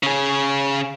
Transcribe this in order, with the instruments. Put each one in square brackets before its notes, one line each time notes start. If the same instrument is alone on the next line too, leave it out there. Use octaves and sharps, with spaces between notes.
[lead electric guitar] C#3 G#4